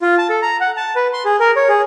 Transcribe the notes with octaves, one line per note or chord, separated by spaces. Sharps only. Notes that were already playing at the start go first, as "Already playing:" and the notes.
F4
A5
A4
A#5
F#5
A5
B4
C6
G#4
A#4
C#5
G#4